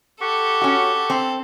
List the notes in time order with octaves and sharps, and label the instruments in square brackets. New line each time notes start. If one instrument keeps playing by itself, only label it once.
[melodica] G4 F#5 C#6 [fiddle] A4
[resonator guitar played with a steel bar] C#4 F#4
C4